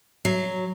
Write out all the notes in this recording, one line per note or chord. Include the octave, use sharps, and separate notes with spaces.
F#3